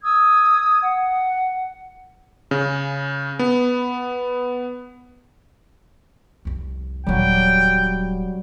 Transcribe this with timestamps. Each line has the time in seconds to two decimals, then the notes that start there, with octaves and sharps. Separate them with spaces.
0.02 D#6 E6 G#6
0.80 F#5
2.51 C#3
3.39 B3
6.45 C2 F2
7.07 D#1 F#3 G3 C#4 G5